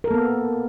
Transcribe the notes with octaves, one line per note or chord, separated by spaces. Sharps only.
A#3 B3 A4 A#4